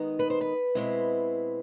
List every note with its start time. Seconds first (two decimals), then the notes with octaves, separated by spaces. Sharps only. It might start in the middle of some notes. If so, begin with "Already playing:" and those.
Already playing: D#3 G#3 B3 D#4
0.19 B4
0.30 C5
0.41 B4
0.75 B2 G#3 C4 E4